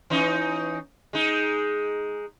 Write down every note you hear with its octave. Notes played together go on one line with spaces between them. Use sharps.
E3 C#4 D#4
G#3 D#4